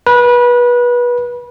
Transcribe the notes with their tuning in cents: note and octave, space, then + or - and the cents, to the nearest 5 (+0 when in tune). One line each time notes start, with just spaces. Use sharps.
B4 -25